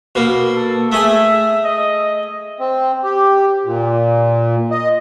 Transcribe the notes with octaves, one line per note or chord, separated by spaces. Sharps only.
B2 A#3
A4
A3 G#4 E5 G#5
D#5
C4
G4
A#2
D#5